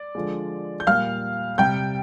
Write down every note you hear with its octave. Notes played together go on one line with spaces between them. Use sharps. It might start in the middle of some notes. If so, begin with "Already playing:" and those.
Already playing: D5
D3 F3 G#3
G6
A#2 G3 F5 F6
C3 G3 G5 G6